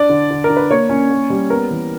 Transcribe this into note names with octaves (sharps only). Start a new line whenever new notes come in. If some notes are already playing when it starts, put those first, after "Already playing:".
Already playing: D4 D5
D3
D3
A#4
D3
B4
A#3 C#5
C#4
A#3
G3
B3 A#4
E3